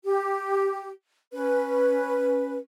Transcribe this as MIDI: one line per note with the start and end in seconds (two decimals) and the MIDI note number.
0.05 0.89 67
1.32 2.58 61
1.32 2.58 71